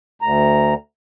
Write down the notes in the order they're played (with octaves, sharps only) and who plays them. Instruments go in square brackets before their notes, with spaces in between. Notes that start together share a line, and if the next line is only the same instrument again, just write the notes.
[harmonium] D2 A#5